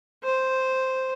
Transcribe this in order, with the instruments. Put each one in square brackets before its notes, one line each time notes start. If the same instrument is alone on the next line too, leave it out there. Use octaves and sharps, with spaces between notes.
[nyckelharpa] C5